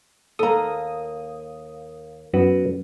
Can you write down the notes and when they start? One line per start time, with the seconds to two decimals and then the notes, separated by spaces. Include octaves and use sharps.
0.39 D#2 A#3 A4 A#5 D#6
2.34 F#2 B3 F#4 B4